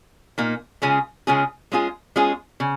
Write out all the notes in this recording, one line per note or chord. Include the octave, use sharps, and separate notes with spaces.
A#2 A#3 D#4
C#3 G#3 C#4 F4 G#4
C#3 G#3 C#4 F4 G#4
G#3 C#4 F4 G#4
G#3 C#4 F4 G#4
C#3